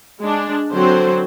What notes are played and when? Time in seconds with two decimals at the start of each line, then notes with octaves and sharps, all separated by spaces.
0.20 G#3 D4
0.72 D3 F#3 C4 C5